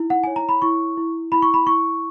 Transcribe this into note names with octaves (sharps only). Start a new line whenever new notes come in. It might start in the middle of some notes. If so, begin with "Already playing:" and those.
Already playing: D#4 E4
F#5
C#5 G#5
A#5
B5
E4 C#6
E4
E4 B5
C#6
B5
E4 C#6